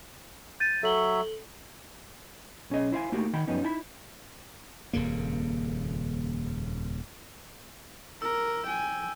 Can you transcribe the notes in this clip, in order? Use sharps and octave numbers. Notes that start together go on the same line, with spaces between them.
G6 A6 D#7
F#3 A4 C#5 E5 F#7 G7
B1 C#4 G#4 D#5
E4 C5 F5 G#5
A3 A#3 D#4 F#4 G4
D#3 F#5 G5 B5
F#2 F3 G3 B3 C#4 D#4
D#4 E4 A5 B5
D#1 F2 C#3 A#3
A#4 E6
G5 G#5